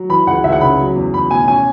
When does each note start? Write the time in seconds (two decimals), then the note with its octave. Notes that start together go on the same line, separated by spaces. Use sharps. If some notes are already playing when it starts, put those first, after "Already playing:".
Already playing: F#3
0.09 E3 B5
0.27 C#2 F#5
0.44 C#2 E5
0.52 F#5
0.61 C#3 B5
0.79 F#3
0.96 E2
1.14 E2 B5
1.31 B2 G#5
1.48 C#4 G#5